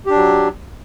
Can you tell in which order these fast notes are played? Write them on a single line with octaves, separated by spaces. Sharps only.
G4 D4 F#3